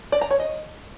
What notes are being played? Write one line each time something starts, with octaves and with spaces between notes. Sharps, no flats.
D5
A#5
C#5
D#5